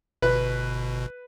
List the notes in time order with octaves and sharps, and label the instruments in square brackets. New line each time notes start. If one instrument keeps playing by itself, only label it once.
[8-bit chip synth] G1 B2 [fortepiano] B4